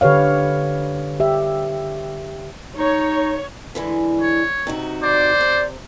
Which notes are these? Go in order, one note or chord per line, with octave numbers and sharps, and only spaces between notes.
D3 G4 B4 C#5 F5
G4 E5
D#4 C#5
D3 E3 G#3
C#5
C3 D#4 F#4
C5 D5
C3